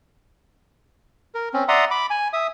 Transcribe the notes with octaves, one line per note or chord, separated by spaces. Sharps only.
A#4
C4 C#4
D5 E5 F#5 A#5 C6 D#6
B5 D6
G#5
E5 D#6